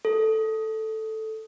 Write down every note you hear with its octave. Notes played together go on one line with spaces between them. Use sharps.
A4